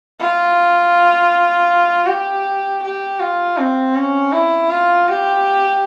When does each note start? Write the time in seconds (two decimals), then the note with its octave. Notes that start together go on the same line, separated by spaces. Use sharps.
0.20 F4
2.07 G4
2.83 G4
3.20 F4
3.57 C4
3.95 C#4
4.32 E4
4.70 F4
5.09 G4